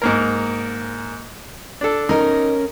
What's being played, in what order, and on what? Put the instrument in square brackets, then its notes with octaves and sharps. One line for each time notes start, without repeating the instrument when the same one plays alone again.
[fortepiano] G#2 A#3 A#4
D4 A4
[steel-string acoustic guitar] C#4 A#4 [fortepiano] D#4